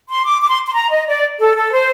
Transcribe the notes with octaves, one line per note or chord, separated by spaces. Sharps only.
C6
D6
D6
C6
C6
A#5
D#5
D5
A4
A4
C5